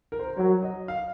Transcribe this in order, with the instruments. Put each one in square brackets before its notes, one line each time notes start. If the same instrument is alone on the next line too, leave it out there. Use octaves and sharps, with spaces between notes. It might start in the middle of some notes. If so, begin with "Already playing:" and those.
[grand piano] A#4
C5
A#4
[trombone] F#3 [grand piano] C#5
[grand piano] D#5
F5